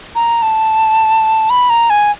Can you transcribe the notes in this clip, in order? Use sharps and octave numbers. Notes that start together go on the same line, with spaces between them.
A#5
A5
B5
A#5
G#5